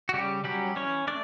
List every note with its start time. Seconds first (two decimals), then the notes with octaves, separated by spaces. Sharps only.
0.09 F#4
0.13 C#3 G3 G4
0.44 F#3 G3 C#4 G4
0.76 E3 C#4 C#5
1.07 A3 D4 D5